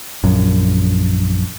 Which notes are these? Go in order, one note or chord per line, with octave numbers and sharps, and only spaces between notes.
A#1 F#2